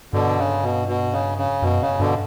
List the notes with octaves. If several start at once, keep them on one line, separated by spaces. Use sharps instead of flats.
G2 B2 D3
C#3
B2
B2
C#3
C#3
F#2 B2
C#3
G2 B2 D3